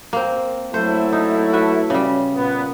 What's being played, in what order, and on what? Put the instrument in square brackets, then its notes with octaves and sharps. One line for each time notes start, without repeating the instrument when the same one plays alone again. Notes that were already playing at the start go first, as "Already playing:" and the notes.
[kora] A#3 C4
[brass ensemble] F#3 A3 E4 [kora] C5
[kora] D#4
F#4 B4 E5
C#3 G3
[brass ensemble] A#2 B3